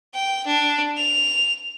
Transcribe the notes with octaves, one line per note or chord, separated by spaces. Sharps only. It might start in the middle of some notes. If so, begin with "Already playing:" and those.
G5
D4
F7